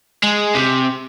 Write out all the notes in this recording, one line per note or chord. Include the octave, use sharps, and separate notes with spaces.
G#3
C3